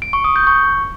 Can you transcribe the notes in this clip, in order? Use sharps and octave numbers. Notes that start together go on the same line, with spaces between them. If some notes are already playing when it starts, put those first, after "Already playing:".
D7
C#6
D#6
G6
C#6